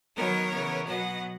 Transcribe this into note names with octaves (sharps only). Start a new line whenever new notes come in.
D#3 F#3 B3 A#4 C#5
C#3 E3 B3
B2 F#3 B3 D#5 F#5